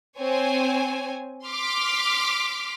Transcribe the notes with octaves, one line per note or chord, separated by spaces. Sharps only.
C4 C#5 G#5
C6 D6 F6 B6